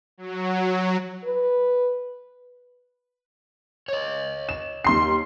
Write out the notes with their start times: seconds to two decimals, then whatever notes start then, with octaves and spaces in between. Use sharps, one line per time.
0.18 F#3
1.25 B4
3.88 C#5 D#5
4.49 E7
4.85 D#2 C6 C7